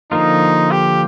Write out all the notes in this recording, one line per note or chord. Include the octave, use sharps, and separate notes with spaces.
D3 F3 A#3 D#4 F4
G4